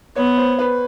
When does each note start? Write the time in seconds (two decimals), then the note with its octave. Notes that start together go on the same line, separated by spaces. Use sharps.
0.16 B3 C#5
0.38 C5
0.59 B4